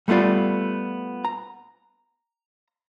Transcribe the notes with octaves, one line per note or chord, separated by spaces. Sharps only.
G3 A3 B3 F4 D5
A#5